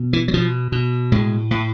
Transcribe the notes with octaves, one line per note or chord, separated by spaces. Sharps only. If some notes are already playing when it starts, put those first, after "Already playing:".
Already playing: B2
E3
F#3
B2 F3
B2
A2 G#3
A2